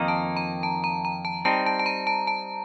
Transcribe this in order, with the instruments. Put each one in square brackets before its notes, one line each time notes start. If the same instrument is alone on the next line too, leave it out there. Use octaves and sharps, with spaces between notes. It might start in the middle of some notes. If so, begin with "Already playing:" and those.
Already playing: [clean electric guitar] F2 D#3 A#3 D#4 [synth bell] G5
[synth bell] A5
A#5
A5
A#5
A#5
A5
[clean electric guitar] G3 C4 D#4 [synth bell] A5
[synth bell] A5
A5
A#5
A5
A5